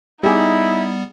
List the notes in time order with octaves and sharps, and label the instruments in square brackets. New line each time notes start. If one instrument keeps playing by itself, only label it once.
[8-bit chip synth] G3 B3 [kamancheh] D#4 [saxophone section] E4 [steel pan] G4 G#4